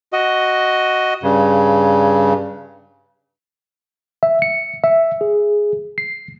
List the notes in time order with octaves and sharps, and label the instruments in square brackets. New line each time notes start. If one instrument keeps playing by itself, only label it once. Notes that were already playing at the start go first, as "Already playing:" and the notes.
[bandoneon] F#4 D#5
G2 C#3
[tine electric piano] E5
C#7
E5
G#4
C7